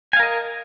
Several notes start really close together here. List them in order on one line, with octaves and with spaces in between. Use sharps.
G#5 F5 A#4 D#5